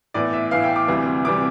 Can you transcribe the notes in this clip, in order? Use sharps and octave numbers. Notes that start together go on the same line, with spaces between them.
A2 E3 B3 D5
E5
A2 E3 B3 F5
G5
D6
D2 C3 E3 G3
C3 E3 G3 D6